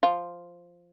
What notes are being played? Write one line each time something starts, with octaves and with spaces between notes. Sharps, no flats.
F3 F4